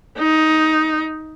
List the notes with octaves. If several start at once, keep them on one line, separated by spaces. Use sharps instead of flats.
D#4